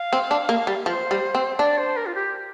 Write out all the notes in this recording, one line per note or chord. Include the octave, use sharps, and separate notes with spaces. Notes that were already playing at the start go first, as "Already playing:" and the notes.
Already playing: F5
C4
D4
A#3
G3
F3 C5
G3
C4
D4 D5
C5
A#4
F4
G4